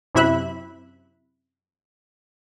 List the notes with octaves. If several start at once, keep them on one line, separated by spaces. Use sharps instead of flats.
F#2 C3 E4 E5 B5 F#6